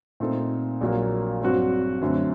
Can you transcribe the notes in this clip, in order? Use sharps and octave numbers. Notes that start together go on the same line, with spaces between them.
A#2 A3 C4 D#4 A4
A#1 A#2 F#3 A#3
G2 F#3 C4 F#4
F#2 D3 A3 C4